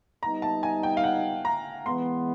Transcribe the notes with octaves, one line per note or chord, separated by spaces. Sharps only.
G3 B3 D#4 A#5
A5
G#5
G5
F5
F#5
A#5
E3 G#3 B3 C6